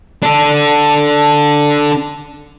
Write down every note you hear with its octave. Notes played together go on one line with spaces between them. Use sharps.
D4 A4